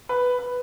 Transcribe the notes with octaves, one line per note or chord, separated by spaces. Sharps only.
B4
B4